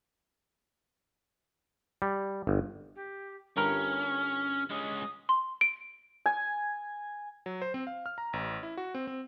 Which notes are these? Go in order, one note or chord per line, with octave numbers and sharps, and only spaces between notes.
G3
G1
G4
G1 G2 C#4 A#4 F6
G#3 C#4 D#6
C6
D7
G#5
F#3
C5
C4
F5
F6
A#5
A1
E4
F#4
C4
C4